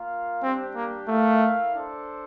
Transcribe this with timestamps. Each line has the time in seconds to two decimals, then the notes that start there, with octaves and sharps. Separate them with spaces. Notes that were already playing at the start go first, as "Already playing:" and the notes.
Already playing: A#3 F4 A#4 F5
0.42 G3 C4 D4 G4
0.75 A#3
1.08 A3 E4 A#4 F5
1.74 D4 A4 C5